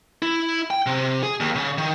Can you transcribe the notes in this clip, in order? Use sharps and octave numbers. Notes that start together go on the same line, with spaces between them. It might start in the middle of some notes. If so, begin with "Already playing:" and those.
E4
G5
C3
G#4
D#2
C#3
D#3